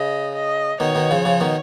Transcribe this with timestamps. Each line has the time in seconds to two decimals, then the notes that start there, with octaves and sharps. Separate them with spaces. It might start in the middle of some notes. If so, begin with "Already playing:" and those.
Already playing: C#3 D#5
0.34 D#5
0.80 B2 D#3 C#5
0.95 B2 D#3
1.11 C#3 F3
1.25 C#3 F3
1.40 B2 D#3